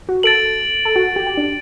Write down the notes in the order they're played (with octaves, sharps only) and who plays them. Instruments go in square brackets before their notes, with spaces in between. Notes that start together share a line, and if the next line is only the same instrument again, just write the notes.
[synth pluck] F#4
[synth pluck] A4 [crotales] A6 D7 F#7
[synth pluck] A4
F#4
G4
G4
D4